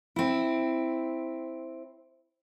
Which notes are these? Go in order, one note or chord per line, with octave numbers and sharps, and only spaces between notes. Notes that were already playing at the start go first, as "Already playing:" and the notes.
C4 E4